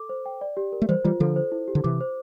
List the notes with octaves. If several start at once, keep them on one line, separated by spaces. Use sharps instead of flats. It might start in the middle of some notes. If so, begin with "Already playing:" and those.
Already playing: A4 D6
C5
G5
D5
G4
A#4
A3
E3 G3 C5
E3 G3 F4
D3 F3 A4
C5
E4
G4
D3
C3 E3 D6
C5